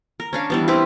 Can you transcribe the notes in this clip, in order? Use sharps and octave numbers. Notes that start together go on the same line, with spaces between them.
A#4
C#4 D4 F5
E3 G3 B3
C4 E4 G4 B4